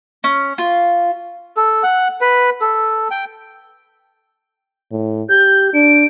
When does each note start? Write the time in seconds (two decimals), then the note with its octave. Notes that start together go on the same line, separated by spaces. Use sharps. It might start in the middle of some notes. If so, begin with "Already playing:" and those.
0.24 C#4
0.58 F4
1.56 A4
1.83 F#5
2.21 B4
2.61 A4
3.11 G5
4.91 A2
5.29 G4 G6
5.74 D4 D7